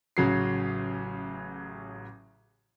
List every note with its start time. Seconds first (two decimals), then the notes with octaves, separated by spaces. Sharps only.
0.17 A1 C#3 F#3 C7